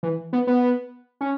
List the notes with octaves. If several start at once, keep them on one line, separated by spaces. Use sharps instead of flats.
E3
B3
B3
C#4